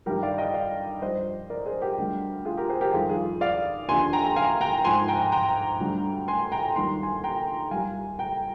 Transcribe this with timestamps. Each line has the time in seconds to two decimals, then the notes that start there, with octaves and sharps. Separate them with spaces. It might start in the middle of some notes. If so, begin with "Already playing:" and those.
0.06 G2 D#3 G3 G4 A#4
0.22 D5 F5
0.38 D#5 G5
0.54 D5 F5
1.02 G2 F3 C5 D#5
1.50 A#4 D5
1.66 G#4 C5
1.82 G4 A#4
1.98 D2 D3 G3
2.45 F4 G#4
2.57 G4 A#4
2.69 G#4 C5
2.81 G4 A#4
2.93 F2 D#3 G3 F4 G#4
3.09 F4 G#4
3.41 D5 F5
3.89 D#2 D3 F3 G#5 C6
4.13 G5 A#5
4.36 F5 G#5
4.61 G5 A#5
4.84 G#2 F3 G#5 C6
5.08 G5 A#5
5.32 G5 A#5
5.80 D2 D3 G3
6.28 G#5 C6
6.52 G5 A#5
6.75 D#2 D#3 G3 C6
7.03 G#5 C6
7.24 G5 A#5
7.71 C2 A#2 G3 F5 G#5
8.19 G5 A#5